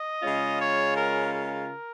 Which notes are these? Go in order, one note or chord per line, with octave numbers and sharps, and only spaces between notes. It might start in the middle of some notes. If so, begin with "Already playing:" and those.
Already playing: D#5
C#3 G#3 C#4 F4
C#5
A#4
A#4